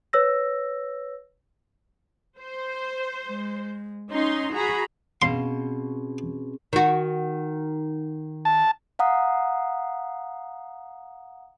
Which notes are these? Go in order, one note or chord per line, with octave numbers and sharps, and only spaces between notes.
B4 C#5 E6 A#6
C5
G#3
C#4 D#4 C6
F#4 G#4 A#5 B5
B2 C4 C#4 G#4 F5 C6
D#3 F#4
A5
F5 F#5 A#5 D#6